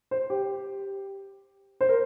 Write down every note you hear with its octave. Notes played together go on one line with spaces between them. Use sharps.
C5
G4
C5
A#4